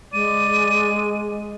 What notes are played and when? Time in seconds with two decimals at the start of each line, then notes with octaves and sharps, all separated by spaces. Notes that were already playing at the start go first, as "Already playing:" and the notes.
0.13 G#3 D5 D#7